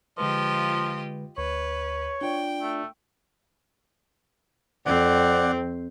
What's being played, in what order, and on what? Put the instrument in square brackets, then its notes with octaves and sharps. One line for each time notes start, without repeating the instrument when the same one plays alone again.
[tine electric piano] D3 G#3 B4 [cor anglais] F3 [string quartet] F4 G4 D#5
[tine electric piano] D2 [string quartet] B4 [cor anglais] C#5
[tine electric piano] D4 F4 D5 [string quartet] G5
[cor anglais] A3
[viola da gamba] F2 [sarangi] C4 [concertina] D5 F#5